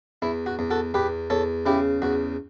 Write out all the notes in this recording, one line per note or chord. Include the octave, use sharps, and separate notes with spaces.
E2 E4
F#4
E2
F#4 A4
E2 G4 B4
E2 A4 C#5
C#3 E4 G4
E2 F#4